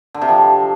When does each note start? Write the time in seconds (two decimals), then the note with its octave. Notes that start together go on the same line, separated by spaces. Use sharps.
0.15 D3
0.22 C3
0.29 F3